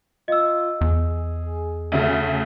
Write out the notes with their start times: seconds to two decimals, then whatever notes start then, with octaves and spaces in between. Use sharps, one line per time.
0.28 F4 D#5 E6
0.81 E2 G#4
1.92 D2 C#3 A3